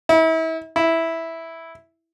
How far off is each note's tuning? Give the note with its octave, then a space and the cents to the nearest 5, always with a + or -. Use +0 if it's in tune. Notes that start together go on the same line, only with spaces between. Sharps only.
E4 -35
E4 -5